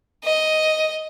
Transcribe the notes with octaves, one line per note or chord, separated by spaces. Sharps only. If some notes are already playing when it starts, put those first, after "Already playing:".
D#5